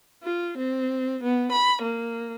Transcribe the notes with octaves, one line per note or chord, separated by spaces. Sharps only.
F4
C4
B3
B5
A#3